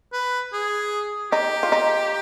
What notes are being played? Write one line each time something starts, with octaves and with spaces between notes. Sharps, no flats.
B4
G#4
D#4 G4
F4
D#4